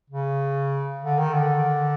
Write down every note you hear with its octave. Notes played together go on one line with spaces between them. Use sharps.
C#3
D3
D#3
D3